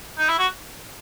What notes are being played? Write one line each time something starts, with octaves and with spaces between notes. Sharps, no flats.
D#4
E4
F#4